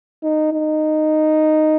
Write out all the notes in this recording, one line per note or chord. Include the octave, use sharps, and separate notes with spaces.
D#4
D#4